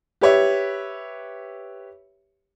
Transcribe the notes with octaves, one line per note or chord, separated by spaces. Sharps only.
G4 B4 C#5 E5